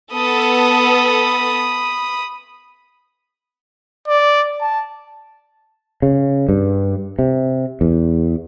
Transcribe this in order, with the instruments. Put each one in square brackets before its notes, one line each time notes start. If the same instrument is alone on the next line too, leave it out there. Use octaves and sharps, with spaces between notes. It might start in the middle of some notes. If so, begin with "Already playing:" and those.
[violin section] B3 A4 [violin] B5 D#6
[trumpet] D5
A5
[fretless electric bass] C#3
G2
C3
E2